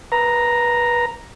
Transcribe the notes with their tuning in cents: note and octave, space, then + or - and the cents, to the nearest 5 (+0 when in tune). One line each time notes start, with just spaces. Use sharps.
B4 -25 A#5 +0